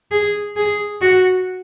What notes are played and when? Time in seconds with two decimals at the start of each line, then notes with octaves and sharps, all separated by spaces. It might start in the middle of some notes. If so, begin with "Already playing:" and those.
0.11 G#4
0.57 G#4
1.02 F#4